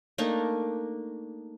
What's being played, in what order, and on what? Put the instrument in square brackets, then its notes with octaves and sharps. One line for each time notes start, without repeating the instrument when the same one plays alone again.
[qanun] A3 A#3 D4 D#4